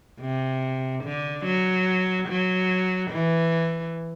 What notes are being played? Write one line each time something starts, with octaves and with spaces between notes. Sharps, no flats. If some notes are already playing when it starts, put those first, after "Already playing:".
C3
D3
F#3
F#3
E3